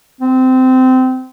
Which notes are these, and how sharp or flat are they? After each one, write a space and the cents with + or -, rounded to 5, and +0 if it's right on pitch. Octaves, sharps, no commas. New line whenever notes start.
C4 -20